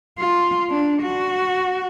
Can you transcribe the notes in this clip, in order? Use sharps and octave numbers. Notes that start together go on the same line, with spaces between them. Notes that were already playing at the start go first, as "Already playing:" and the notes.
F4
D4
F#4